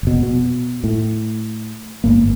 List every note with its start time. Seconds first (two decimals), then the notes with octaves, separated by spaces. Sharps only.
0.03 F1 B2
0.23 B2
0.84 A2
2.04 G1 G#2 A#3